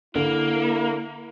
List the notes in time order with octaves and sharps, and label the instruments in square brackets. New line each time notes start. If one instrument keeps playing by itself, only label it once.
[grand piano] D3 [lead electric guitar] A#3 [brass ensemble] E4